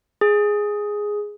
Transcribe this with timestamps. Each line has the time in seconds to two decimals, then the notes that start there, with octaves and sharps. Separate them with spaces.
0.21 G#4